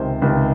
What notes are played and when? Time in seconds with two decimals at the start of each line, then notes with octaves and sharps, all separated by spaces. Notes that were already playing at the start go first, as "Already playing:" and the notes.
Already playing: C#2 C3 D#3 C5
0.22 C#2 C3 D#3